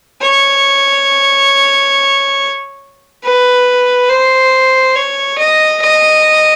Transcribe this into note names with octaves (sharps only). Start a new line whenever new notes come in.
C#5
B4
C5
C#5
D#5
D#5